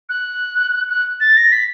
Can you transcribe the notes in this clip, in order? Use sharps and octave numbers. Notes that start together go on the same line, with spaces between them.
F#6
F#6
A6
A#6
B6